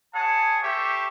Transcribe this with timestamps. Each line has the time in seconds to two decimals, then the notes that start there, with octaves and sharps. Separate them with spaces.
0.14 G#4 C#5 F#5 A5
0.63 G4 A4 C5 E5 C#6